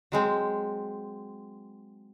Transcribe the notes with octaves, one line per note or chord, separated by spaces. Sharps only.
F#3 G#3 C4